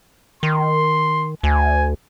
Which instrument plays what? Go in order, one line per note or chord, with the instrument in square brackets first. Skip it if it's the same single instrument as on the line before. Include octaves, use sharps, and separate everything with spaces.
[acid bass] D#3 [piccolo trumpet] C6
[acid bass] D2 [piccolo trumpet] G#5